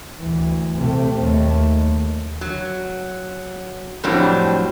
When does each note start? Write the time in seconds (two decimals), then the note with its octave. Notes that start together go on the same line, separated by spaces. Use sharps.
0.18 D2 E3
0.75 C3 A3
1.18 D#2 A3
2.41 F#3
4.04 F2 A2 F#3 G3 C4 D4